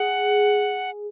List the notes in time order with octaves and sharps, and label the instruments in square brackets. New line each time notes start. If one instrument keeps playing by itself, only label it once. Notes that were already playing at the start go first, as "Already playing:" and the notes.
Already playing: [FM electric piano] G#4 [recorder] F#5